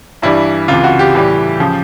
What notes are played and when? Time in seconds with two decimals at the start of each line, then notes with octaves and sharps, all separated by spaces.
0.22 G2 E3 G3 E4
0.68 C#2 C3 E3 F4
0.84 F#4
0.99 G4
1.15 A2 E3 G3
1.60 C#3 F3